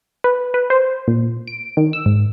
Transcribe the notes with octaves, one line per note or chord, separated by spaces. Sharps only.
B4
B4
C5
A#2
D7
D#3
E6
G#2